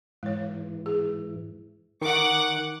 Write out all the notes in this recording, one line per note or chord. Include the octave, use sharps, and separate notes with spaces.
G#2 E3 G#3 C#5
G#4
D#3 F#5 C#6 D6